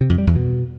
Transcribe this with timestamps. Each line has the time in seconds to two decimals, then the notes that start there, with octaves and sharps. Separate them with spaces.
0.01 C3
0.10 F2
0.18 G3
0.27 E2
0.36 B2